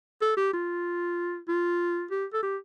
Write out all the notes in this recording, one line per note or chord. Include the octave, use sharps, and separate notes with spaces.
A4
G4
F4
F4
G4
A4
G4